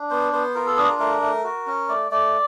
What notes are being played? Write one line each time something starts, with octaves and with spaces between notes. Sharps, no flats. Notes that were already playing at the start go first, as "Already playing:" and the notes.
Already playing: D4
B3 C5
B3 C5
F4 A#4
A4
D4 G#4
A#4
A3 A#4
A3
F#4
C#4
A3 D5
A3 D5